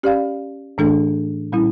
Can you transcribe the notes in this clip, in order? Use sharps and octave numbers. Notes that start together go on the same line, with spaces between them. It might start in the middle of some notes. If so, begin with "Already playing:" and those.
C#4 G4 D5 F5
A2 E3 A3 D4 A4
A#2 G3 C#4 E4